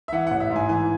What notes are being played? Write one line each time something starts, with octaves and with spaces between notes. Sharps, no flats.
E5
E3 F#5
A1 F#5
E5
G#2
G#5
E3 G#5